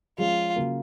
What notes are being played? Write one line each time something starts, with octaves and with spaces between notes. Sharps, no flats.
F3 G#3 C#4 F4
C#3 F#3 A#3